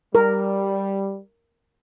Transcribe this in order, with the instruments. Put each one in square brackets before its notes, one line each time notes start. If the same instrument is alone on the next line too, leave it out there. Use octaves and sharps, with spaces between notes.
[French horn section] G3 [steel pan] A#4